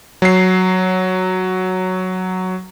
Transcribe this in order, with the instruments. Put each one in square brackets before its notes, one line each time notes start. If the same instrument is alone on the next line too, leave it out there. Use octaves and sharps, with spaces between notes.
[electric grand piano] F#3 C7